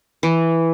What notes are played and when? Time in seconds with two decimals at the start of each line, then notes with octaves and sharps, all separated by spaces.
0.23 E3